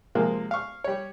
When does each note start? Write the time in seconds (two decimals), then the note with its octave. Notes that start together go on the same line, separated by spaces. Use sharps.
0.15 C3 F3 G#3 A#3
0.51 F5 C#6
0.84 G3 C#5